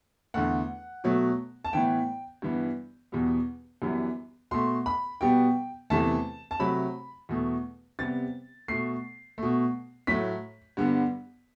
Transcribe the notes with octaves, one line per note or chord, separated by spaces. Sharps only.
E2 D3 A3 F#5
B2 F#3 A3
A5
A2 E3 B3 G5
G2 E3 B3
E2 B2 G3 B3
F#2 E3 G3 B3
B2 A3 C6
B5
B2 G3 B3 G5
E2 C3 E3 A3 A5
A5
C3 F#3 A3 B5
E2 B2 A3
C3 G3 B3 A6
B2 A3 C7
B2 A3
A2 F#3 A3 B6
G2 D3 G3 B3